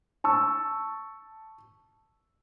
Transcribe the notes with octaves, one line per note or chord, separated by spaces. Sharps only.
A5 C#6 E6